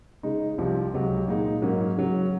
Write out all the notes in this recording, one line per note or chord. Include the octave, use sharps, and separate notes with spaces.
C#3 G#3 D#4
C2 C3 F3
C#2 C3 F#3
A#2 G#3 D#4
G#2 F#3 A#3 C#4
C#3 F#3 C#4